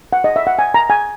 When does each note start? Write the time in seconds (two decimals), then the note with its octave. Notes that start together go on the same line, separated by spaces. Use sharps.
0.13 F#5
0.24 D#5
0.36 E5
0.47 F#5
0.59 G#5
0.74 A#5
0.90 G#5